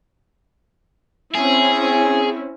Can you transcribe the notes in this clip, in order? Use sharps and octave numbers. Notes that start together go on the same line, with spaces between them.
C4 C#4 E4 G#4